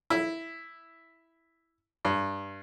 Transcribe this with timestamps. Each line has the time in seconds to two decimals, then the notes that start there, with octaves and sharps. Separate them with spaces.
0.10 E4
2.05 G2